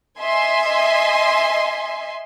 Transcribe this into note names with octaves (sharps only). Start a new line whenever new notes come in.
D#5 E5 G#5 C6